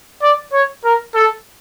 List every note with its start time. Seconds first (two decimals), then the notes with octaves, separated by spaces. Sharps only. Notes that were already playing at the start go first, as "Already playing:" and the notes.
0.23 D5
0.53 C#5
0.84 A#4
1.15 A4